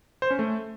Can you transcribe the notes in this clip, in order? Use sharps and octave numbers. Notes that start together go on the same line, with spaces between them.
C5
C#4
A3